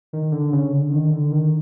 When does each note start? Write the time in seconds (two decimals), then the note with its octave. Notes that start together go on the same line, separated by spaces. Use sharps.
0.13 D#3
0.32 D3
0.52 C#3
0.73 D3
0.92 D#3
1.12 D3
1.32 D#3